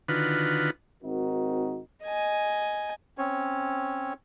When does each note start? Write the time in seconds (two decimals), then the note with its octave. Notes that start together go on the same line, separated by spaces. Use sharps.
0.09 D3 D#3 F4 F#4 B4
1.04 G#1 C4 D#4 F#4 A#4
2.03 D#5 G#5
3.18 C4 C#4 C#5